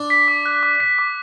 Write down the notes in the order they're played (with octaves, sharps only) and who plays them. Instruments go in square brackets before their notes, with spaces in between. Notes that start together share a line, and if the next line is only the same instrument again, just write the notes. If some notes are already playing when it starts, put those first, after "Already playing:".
Already playing: [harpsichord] D4
[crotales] B6
D6
F#6
D6
B6
D6